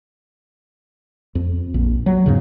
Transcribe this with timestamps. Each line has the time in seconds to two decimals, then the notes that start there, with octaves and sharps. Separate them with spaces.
1.35 F2
1.74 A#1
2.06 F#3
2.26 E2 G#2 C#3